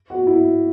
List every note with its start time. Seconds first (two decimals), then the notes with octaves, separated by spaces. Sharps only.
0.10 F#4
0.27 E4